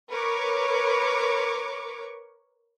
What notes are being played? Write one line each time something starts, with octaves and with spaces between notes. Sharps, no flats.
A#4 B4 C#5 C#6 D6